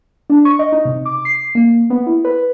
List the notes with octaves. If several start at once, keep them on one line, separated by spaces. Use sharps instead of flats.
D4
C#6
D#5
D#4
C3
D6
C7
A#3
B3
E4
B4